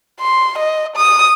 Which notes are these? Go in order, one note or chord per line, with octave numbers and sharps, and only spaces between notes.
C6
D#5
D#6